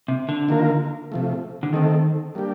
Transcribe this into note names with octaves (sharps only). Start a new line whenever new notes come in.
C3
D3
D#3 A#3 F4 A#4
C3 F3 A3
D3
D#3 A3 C4 D#4 A4
G3 A#3 D4 G4